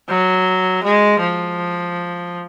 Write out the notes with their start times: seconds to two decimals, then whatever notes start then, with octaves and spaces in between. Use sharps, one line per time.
0.09 F#3
0.83 G#3
1.21 F3